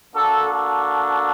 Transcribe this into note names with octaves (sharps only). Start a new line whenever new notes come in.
A#3 D4 F#4 A4
A4